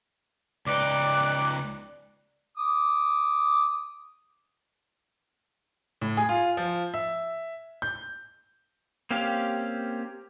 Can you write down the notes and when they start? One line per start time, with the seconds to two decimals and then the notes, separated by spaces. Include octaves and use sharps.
0.66 C#2 D#4 B4 D5 G5 D6 F#6
2.58 D6 D#6
6.01 A2
6.17 G#4
6.29 F4
6.57 F3
6.94 E5
7.82 G6
9.11 A#3 C4 C#4 G4 F5